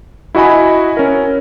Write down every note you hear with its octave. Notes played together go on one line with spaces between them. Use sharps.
E4 F#4 D#5 G#5 B5
C#4 A#4